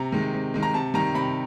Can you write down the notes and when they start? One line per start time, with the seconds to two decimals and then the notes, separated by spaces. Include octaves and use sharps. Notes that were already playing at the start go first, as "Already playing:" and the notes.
Already playing: C3 A#5
0.12 D#3 G#3
0.34 C3
0.54 D#3 G#3
0.63 A#5
0.74 C3 A5
0.94 D#3 G3 A#5
1.14 C3 B5